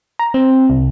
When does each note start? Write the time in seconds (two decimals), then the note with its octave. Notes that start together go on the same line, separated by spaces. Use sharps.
0.19 A#5
0.34 C4
0.70 C2